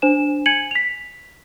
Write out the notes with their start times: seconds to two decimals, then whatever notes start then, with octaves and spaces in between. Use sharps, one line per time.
0.02 D4 C5 G#5 E7
0.46 G#5 G#6 C#7 D#7 F#7
0.71 B6 F7